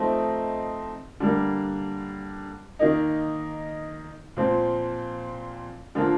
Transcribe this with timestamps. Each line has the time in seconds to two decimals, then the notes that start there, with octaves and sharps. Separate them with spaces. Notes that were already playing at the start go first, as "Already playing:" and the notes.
Already playing: F3 A3 C4 D#4
1.20 D3 G3 A#3
2.79 D#3 A#3 D#4
4.37 A#2 F3 C4
5.95 D3 F3 A#3 F4